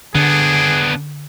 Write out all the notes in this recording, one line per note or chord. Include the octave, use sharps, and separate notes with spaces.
D3 B3 D4 G#4